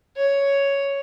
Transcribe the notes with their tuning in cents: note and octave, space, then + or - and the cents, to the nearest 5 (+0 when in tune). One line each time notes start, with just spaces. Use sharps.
C#5 +5